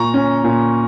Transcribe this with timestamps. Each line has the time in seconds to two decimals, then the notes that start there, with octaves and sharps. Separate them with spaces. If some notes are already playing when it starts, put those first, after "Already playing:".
Already playing: A#2 A#5 C#6
0.14 C#4
0.44 A#2